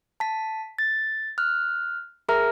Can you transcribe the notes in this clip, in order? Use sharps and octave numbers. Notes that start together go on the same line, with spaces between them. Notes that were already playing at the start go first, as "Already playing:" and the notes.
A5 B6
A6
F6 F#6
G#4 A#4 E5 A#5 F6